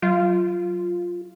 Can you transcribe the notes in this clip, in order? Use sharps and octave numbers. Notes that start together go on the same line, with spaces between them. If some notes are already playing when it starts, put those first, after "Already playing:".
F#3 F4